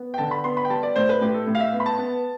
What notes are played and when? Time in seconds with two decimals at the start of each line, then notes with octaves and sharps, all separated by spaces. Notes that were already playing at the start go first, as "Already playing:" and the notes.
Already playing: B3
0.14 G5
0.18 D3 A5
0.31 B5
0.44 B3 C6
0.57 B5
0.65 G5
0.70 G3 A5
0.83 D5
0.96 A2 C5
1.09 B4
1.21 A2 G4
1.34 A4
1.47 A2
1.55 F5
1.60 E5
1.73 B3
1.80 B5
1.86 A5
1.99 B3